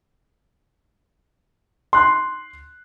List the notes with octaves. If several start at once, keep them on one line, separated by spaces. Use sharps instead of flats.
C6 F#6